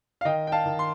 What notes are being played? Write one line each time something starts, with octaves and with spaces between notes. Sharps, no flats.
F5
D#3 D#5 G5
G5
F5 A5
D#3
C6